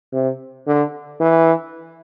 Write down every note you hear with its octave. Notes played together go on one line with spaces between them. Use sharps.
C3
D3
E3